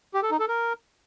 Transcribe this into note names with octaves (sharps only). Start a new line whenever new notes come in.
G4
A4
D#4
A4
A#4